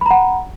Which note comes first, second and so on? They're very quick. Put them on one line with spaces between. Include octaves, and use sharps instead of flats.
B5 A#5 F#5